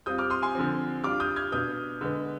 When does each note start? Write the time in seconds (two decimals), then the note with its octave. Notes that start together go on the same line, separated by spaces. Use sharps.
0.06 G3 C4 F4 D#6 G6
0.18 D6 F6
0.30 C6 D#6
0.42 G#5 C6
0.55 D3 F3 C4
1.04 G3 D4 F4 D6 F6
1.20 D#6 G6
1.36 F6 G#6
1.52 B2 B3 D4 D#6 G6
2.01 D3 G#3 B3